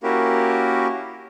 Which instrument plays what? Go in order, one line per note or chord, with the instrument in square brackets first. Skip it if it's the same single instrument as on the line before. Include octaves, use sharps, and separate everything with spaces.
[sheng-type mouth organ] A#3 C#4 E4 F#4 G4 A#4